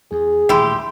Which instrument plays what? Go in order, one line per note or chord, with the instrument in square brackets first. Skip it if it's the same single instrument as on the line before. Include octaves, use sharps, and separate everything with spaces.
[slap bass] E2 [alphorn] G#4
[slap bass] D#1 A1 [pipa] E4 G4 [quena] C6